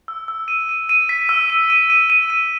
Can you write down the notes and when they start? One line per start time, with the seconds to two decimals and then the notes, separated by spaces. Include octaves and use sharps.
0.08 E6
0.28 E6
0.48 D#7
0.69 D#7
0.89 D#7
1.09 B6
1.29 E6
1.50 D#7
1.70 D#7
1.90 D#7
2.10 D#7
2.30 D#7